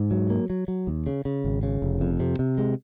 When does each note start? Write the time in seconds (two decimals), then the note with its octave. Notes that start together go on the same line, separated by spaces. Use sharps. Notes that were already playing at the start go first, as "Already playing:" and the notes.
Already playing: G#2
0.11 F#3
0.30 A#3
0.50 F#3
0.68 F#3
0.87 D#2
1.07 C#3
1.25 C#3
1.44 G#1
1.63 C#3
1.82 F1
2.01 F2
2.20 C3
2.39 C3
2.58 G#3